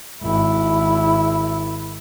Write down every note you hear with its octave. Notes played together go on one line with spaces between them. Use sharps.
G#1 E4